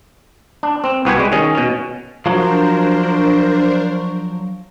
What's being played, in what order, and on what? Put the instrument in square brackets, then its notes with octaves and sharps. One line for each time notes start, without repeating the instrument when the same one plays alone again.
[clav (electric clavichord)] D4
C4
C2 B3 F#4 G4 G#5
G3 G#3
D#3 C#4 G#4
B2 C#4
[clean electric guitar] F3 F#3 [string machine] D4 A#4 C5